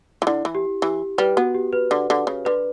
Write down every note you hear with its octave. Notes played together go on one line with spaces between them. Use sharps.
E3
D3 E4
E3
G4
E3 G4
G3 B4
B3 F#4
G4
B4
D3
D3
C#3
D3 B4